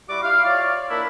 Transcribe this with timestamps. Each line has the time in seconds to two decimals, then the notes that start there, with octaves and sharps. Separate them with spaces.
0.09 G3 E4 F#4 D6
0.23 E4 F5
0.44 F4 C#5 D5
0.89 A#3 D4 E4